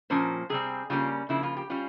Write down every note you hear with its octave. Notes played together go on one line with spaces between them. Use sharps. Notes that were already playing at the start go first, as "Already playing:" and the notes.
A#2 F3 A#3 C#4 C5
C3 G3 C4 G#4
C#3 G3 A#3 C#4 F4
C#3 F3 A#3 E4
F4
G4
G3 C#4 F4